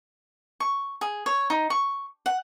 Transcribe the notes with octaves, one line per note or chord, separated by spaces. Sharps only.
C#6
G#4
C#5
D#4
C#6
F#5